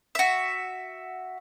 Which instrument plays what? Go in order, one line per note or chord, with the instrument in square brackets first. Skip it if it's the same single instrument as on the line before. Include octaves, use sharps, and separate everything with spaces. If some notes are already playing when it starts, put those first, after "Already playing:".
[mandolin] F#4 E5